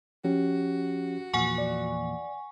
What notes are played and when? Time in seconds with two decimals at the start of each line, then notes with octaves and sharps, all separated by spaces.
0.24 F3 C#4 F#4 G4
1.34 E2 A#2 F3 F#5 G#5 C#6
1.58 D5